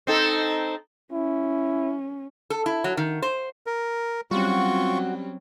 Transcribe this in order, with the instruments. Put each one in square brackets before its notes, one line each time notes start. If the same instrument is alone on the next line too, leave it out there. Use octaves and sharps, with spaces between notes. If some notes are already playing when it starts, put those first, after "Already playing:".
[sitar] C4 D#4 A4
[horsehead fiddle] C#4 [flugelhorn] E4
[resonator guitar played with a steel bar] A4
E4
F#3
D#3
C5
[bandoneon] A#4
[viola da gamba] F#3 C4 C#4 [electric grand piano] G3 [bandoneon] F4 C#6 [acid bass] F#4